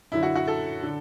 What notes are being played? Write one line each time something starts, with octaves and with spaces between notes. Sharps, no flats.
F#2 D3 E4
F#4
F#4
A4
D3